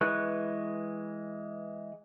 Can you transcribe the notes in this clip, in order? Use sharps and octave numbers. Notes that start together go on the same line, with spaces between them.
E3 G#3 B4 C#6 F#6